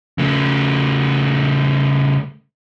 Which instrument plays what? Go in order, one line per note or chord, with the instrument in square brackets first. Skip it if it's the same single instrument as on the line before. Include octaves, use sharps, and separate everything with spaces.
[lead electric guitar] C#3 A3